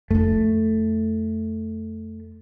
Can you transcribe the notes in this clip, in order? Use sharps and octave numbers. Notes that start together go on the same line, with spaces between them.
F2 A3 E4